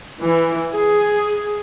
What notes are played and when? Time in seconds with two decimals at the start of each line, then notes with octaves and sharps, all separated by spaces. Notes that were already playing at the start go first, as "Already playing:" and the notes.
0.22 E3
0.75 G#4